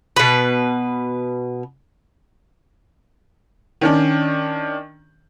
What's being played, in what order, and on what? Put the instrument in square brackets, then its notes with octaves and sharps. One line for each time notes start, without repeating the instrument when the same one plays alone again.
[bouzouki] B2 B4
[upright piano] D#3 C#4 D4